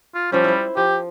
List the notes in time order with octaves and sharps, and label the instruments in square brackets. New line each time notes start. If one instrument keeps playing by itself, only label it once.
[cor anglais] F4
[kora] F3 C#4 [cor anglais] G3
[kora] E4 C5
[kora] F3 [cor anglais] G4